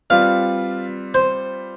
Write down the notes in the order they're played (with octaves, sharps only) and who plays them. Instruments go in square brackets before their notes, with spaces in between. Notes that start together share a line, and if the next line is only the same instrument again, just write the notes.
[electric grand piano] G3 C4 F4 B4 D5 [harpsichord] F5
[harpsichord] C5